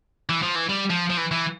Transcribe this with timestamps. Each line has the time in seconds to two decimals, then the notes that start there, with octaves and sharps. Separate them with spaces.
0.29 E3
0.43 F3
0.56 E3
0.69 G3
0.90 F3
1.10 F3
1.17 E3
1.32 E3